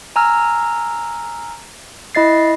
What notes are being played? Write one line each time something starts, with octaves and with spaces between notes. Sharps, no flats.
G#5 A#5 E6 F6
E4 D#5 A6 C7